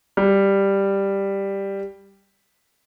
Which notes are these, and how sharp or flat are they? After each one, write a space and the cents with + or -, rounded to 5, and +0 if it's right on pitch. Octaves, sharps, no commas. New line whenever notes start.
G3 +5